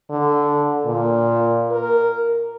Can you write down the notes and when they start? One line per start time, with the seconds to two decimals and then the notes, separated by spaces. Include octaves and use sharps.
0.10 D3
0.85 A#2
1.71 A#4